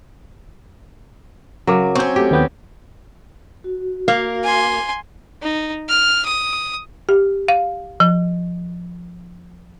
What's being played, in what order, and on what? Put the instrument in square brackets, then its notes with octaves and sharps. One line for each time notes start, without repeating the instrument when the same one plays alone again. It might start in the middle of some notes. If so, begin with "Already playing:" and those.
[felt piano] C#3 A#4 D6 [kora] F#3
[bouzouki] C4 C#4 [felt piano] C#6 G6
[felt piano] F#3 A3 [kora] G4
[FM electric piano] D#2 B3 G5
[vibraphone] F#4
[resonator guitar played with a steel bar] A#3 [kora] F5
[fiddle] G#5 C6
D#4
F6
D#6
[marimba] G4
F5
F3